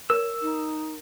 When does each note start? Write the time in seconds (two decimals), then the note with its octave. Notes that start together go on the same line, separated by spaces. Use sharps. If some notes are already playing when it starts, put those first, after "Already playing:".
0.10 A#4 C#5 E6
0.42 D#4